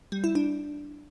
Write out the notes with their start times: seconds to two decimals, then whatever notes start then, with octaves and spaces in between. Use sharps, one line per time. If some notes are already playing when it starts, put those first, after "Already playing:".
0.12 G3
0.24 E4
0.35 D4